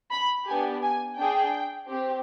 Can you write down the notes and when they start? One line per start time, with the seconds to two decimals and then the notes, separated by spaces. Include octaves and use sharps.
0.12 B5
0.47 B3 D4 G4 G#5
0.82 G#5
1.17 D4 G#4 G5
1.88 C4 G4